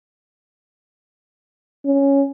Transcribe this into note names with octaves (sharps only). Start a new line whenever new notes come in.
C#4